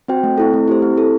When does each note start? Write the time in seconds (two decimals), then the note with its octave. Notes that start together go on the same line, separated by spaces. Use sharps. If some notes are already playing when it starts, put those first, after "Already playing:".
0.08 C4 F#4 C5 G5
0.23 A3
0.38 C4 E4 A4
0.53 A3
0.68 E4 G4 C5
0.82 C4
0.97 E4 A4